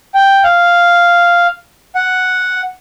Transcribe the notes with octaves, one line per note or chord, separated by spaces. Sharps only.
G5
F5
F#5